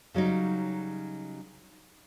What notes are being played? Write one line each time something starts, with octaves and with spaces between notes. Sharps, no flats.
C#3 F#3 G3 D#4